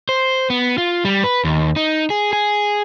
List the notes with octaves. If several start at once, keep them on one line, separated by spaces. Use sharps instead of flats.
C5
B3
F4
G3
B4
D#2
D#4
G#4
G#4